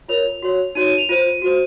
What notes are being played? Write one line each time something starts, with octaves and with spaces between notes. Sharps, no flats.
F4 A#4 C#5 F7
F#4 C#5
D#4 F#4 C#5 D#7
D#7
F7
F4 C5 D#7
F#4 C5